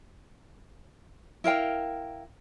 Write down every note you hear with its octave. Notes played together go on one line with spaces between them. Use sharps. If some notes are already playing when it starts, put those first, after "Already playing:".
E4 A#4 F5 G5